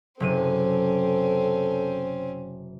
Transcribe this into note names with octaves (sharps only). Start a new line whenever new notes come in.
F#1 C3 C4 C#4 A4 D#7